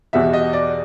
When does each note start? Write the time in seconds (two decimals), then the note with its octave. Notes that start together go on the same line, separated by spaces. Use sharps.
0.13 E2 B2 G3 B3 E5
0.33 D#5
0.53 D5